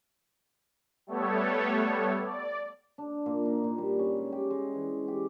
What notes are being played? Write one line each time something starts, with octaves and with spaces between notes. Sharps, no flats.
G3 A3 B3 A4 C#5
D5
D4
A#2
D#4
A#2
G3
C#4
G#3
G4
G#3
E3
G4